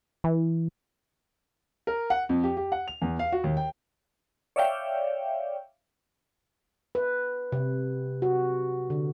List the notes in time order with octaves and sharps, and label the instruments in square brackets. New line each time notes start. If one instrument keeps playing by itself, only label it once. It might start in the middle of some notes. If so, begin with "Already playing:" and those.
[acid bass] E3
[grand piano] A#4
F#5
F2
G4
G4
F#5
F7
E2
F5
F#4
D#2
G5
[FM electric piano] C#5 D5 E5 F5 G5
[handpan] B4
C3
F#4
D3